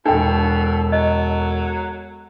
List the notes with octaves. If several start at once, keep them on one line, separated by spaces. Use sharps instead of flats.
E1 B2 D4 A4 G5
F#3 D#5